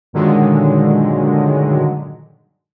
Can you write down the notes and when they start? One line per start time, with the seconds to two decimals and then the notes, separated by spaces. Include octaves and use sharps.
0.13 G2 A#2 D3 D#3 F#3 G#3